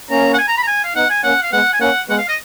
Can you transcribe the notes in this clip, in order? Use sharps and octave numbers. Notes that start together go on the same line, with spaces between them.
A#3 C#4 A#5
F#5
G#5
A#5
B5
A#5
G#5
F5
B3 D#4 F#5
G#5
A#3 C#4 F#5
F5
G#3 B3 F#5
G#5
A#3 C#4 F#5
G#3 B3 F#5
F5
D#5